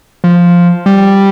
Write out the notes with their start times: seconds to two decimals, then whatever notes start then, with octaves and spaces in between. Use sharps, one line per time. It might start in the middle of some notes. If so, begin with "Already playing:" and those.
0.24 F3
0.86 G3